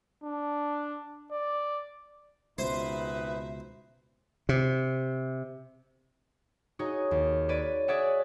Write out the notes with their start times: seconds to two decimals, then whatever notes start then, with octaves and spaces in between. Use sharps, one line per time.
0.24 D4
1.32 D5
2.58 G#1 C#2 B2 D#4 B4 C5 E5
4.49 C3
6.79 D#4 F#4 G#4 C#5 D#5
7.11 D#2
7.49 B4 C#5 D5 D#7
7.88 G#4 C#5 D5 E5 F#5